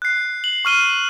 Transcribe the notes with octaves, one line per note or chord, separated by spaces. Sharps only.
F#6 C7
F#7
C#6 F6 D#7 G7